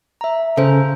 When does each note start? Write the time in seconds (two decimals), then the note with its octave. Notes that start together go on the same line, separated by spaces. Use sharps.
0.21 E5 A#5
0.57 C#3 A4 C5